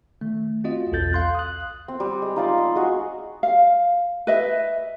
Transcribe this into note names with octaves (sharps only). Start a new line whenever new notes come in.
D#3 A3
C4 F4 F#4 D#5
B1 E2 F4 A4 G6 A6
F5 C6 F#6
D#6 F#6
C4
G3
G#3
D#4 F4 D5
D#5
G#3 F#4 G#4
F5
B4 D#5 E5